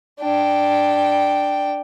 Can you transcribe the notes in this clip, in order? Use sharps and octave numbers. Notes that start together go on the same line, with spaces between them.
D4 G5